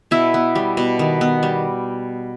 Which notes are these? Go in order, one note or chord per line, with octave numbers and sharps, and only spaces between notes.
B2 E4 E5
B3
G3
B2
D#3
B3
G3